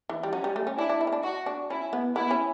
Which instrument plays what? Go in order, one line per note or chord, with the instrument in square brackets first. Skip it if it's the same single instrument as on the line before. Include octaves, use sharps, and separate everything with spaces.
[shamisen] E3
G3
[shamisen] F#3 [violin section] C#4
[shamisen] G3
A3
C#4
[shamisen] D4 [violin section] E4
[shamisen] D4
E4
C#4
D4
[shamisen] E4 [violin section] F#4
[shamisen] D4
[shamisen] C#4 [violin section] E4
[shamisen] B3
[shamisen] B3 [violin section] E4
[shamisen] C#4